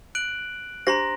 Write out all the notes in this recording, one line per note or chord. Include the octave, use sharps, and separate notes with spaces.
F#6 D7 F#7
D4 G4 C5 A#5 C6 A#6